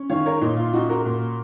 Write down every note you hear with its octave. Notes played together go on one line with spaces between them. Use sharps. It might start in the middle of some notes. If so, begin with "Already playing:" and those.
Already playing: C#4
D#3 C#5 F5
A#4 C#5
A#2 D#4
F4
C#4 D#4 F#4
F#4 A#4
A#2